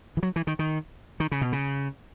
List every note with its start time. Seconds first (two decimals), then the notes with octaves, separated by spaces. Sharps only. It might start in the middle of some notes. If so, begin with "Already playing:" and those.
0.17 E3
0.23 F#3
0.36 E3
0.47 D#3
0.59 D#3
1.20 D#3
1.32 C#3
1.41 B2
1.52 C#3